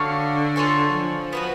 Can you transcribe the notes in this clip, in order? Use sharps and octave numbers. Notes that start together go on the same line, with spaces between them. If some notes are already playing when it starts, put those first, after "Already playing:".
Already playing: D3 D4 F#4 C#5 F5
F4 A4 C#5 G#5
F3
B3 F#4 B4